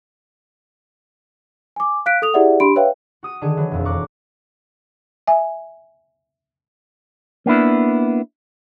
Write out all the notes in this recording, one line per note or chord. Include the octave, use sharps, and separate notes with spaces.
G#5 D6
F5 F#6 B6 D7
A4 D#6 F7
E4 G4 G#4 D5 E5 F#5
D4 G4 B5 C6 D7
B4 C#5 E5 F5 G5
F#4 D#6 D#7
D3 D#3 G#4
E3 F#3
E1 F2
A#5 C#6 D6 F#6
E5 G#5
A#3 B3 D4 E4